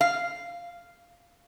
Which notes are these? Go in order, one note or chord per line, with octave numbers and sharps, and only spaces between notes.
F5